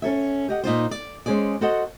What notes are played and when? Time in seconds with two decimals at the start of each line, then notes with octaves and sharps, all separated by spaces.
0.02 C#4 A4 C#5 E5
0.48 G4 D#5 F#5
0.63 A#2 D#4 F4 C5
0.91 D5
1.26 G#3 C#4 G#4 C5 D5
1.61 F#4 A4 C5 D#5 F#5